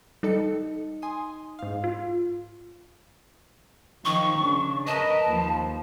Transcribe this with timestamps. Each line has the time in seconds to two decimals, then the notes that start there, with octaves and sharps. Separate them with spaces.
0.23 G3 D#4 A4 C#7
1.02 G#5 C6 D#6
1.59 G#2 F5
1.84 F4
4.05 D#3 F3 C#6
4.38 C#3 D4
4.87 A#4 B4 D#5 A5
5.27 D#2 F3